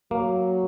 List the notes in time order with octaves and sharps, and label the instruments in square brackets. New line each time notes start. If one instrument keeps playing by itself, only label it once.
[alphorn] F#3 [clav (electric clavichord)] A#3